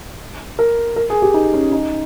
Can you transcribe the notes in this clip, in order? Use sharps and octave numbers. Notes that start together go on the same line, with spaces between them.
A#4
A#4
G#4
G4
D#4
C#4
D#4